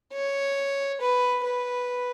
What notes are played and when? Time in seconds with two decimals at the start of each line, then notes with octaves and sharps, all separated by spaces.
0.13 C#5
1.01 B4
1.44 B4